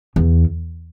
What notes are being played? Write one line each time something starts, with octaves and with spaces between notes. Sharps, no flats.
E2